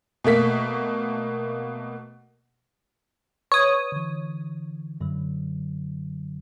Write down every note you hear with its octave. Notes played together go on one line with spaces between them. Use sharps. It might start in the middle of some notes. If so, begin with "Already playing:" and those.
B2 A3 A#3 B6
B4 C#5 D#6
D3 E3
F#2 D3 F#3